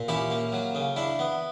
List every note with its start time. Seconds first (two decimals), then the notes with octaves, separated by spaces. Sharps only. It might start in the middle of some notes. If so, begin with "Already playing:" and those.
Already playing: A#2
0.08 C#4 E4 G4
0.30 A#3
0.52 F#3
0.75 C#3
0.96 D4 E4
1.19 B3